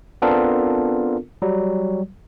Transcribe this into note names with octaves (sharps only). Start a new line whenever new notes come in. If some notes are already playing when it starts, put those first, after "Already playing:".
B3 C4 D4 F4 A4 A#4
F#3 G3